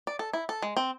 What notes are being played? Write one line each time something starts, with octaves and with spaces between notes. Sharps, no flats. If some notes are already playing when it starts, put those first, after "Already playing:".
D5
A4
E4
A4
G#3
C4